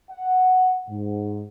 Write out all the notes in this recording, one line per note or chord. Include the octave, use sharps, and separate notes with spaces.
F#5
G#2